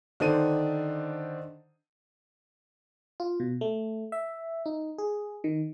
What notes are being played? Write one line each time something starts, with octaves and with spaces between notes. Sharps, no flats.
D3 D#3 D4 C5 D#7
F4
B2
A3
E5
D#4
G#4
D#3